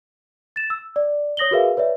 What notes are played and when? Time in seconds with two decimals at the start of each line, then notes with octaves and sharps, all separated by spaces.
0.56 A6 E7
0.70 E6
0.96 D5
1.37 C#5 D#6 A#6 F#7 G7
1.51 F#4 G#4 A#4 B4 E5 F5
1.77 B4 C#5 D5 E5